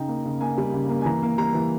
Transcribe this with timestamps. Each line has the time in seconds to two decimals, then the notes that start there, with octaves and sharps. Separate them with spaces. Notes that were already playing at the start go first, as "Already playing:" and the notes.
Already playing: C#3 D#4 G5
0.08 A#3
0.25 C#3
0.40 A#3 G#5
0.57 G3
0.74 C#3
0.89 A#3
1.01 G#5
1.05 E3 A#5
1.22 A#3
1.38 G3 A#5
1.54 E3